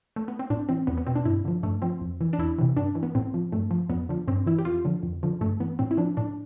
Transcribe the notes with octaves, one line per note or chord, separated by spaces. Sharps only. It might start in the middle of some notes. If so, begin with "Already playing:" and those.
A3
B3
C4
A2 D4
E3 C4
E2 B3
B3
B2 C4
D4
G2 E4
D3 F3
G2 A3
F3 C4
F2
E3
D4
E2 E4
C3 E3
G2 D4
E3
B3
A2 C4
F3
G2 A3
F3
F2 B3
D3 F3
G2 C4
E3 E4
G4
F2 F4
D3 F3
F2
D3 F3
G2 A3
E3 B3
A2 C4
E4
F3 D4
A2 D4